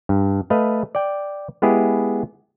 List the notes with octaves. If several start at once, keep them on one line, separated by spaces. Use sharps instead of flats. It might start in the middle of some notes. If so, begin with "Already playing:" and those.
G2
A3 B4 D#5 F5
D5 G5
G#3 B3 E4 G4 G#4